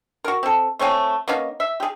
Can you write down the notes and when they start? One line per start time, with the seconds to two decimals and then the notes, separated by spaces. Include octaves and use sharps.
0.24 F#4 A#4
0.43 C4 A4
0.79 A3 C4 C#5 G#5
1.28 A#3 B3 C#4 D#4
1.60 E5
1.80 G4 G#4